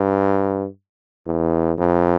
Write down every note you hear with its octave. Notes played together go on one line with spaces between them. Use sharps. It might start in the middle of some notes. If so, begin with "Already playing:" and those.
Already playing: G2
E2
F2